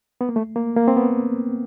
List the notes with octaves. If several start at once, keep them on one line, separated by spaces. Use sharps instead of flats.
B3
A#3
A3
A#3
A#3
C4
B3